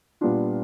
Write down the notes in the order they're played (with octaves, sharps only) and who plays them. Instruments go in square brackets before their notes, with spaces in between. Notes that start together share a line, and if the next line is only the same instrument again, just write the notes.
[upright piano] A#2 G3 B3 D4 F4